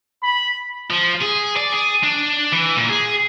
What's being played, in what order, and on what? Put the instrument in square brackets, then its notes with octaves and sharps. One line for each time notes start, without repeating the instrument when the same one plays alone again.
[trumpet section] B5
[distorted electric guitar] F3
G#4
D5
G#4
D4
E3
A#2
G#4